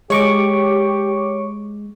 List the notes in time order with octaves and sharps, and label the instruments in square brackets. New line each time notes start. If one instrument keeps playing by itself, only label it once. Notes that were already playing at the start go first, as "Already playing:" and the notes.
[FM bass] G#3 [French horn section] G4 [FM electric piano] C#5 C#6 D6